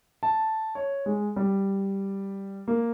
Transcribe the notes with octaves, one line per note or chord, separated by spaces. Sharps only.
A5
C#5
G#3
G3
A#3